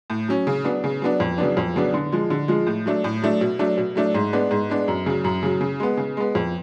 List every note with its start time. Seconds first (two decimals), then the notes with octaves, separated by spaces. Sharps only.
0.10 A2
0.28 F#3 C#4
0.47 C#3
0.64 F#3 B3 D4
0.84 C#3
1.02 F#3 B3 D4
1.20 F2
1.38 C#3 F#3 B3 D4
1.57 F2
1.76 C#3 F#3 B3 D4
1.94 D3
2.12 F3 G#3
2.30 D3
2.48 F3 G#3
2.67 A2
2.86 F#3 A3 D4
3.04 A2
3.22 F#3 A3 D4
3.41 B2
3.59 F#3 A3 D4
3.78 B2
3.95 F#3 A3 D4
4.14 G#2
4.33 G#3 B3 D4
4.51 G#2
4.70 G#3 B3 D4
4.88 F#2
5.06 C#3 F#3
5.24 F#2
5.43 C#3 F#3
5.61 C#3
5.80 G#3 B3
5.97 C#3
6.17 G#3 B3
6.35 F2